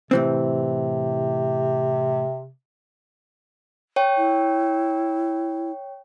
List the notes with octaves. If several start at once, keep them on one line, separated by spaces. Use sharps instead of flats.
A2 C3 E3 C4
C#5 G5
E4